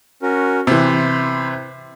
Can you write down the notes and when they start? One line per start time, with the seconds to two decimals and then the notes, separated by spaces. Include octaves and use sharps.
0.23 C#4 F#4 A#4
0.67 C3 E3 C5 B5